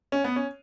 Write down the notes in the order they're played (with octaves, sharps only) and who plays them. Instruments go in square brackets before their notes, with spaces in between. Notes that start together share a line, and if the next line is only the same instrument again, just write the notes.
[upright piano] C#4
B3
C#4